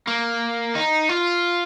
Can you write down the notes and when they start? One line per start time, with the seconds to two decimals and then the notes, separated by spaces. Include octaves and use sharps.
0.08 A#3
0.75 D#4
1.09 F4